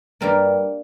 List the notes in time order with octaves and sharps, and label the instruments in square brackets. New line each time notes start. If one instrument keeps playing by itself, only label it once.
[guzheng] G2 G3 A#3 A#4